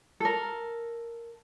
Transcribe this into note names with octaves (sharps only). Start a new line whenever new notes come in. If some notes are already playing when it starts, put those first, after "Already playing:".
A4 A#4